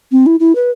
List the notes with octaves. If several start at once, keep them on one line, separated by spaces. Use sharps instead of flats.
C4
E4
E4
B4